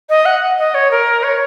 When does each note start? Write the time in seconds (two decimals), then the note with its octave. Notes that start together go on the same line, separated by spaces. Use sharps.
0.09 D#5
0.25 F#5
0.58 D#5
0.74 C#5
0.91 A#4
1.23 C#5